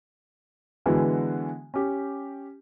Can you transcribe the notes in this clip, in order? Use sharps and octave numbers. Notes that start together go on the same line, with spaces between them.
D3 E3 G#3 B3 F#4
C#4 G4